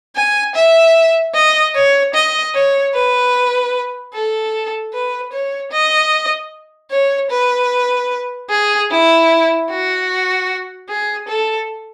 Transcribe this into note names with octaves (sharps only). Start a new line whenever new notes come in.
G#5
E5
D#5
C#5
D#5
C#5
B4
A4
B4
C#5
D#5
C#5
B4
G#4
E4
F#4
G#4
A4